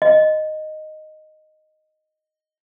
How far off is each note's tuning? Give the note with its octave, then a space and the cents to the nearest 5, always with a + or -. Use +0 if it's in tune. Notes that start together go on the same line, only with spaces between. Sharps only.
D#5 -5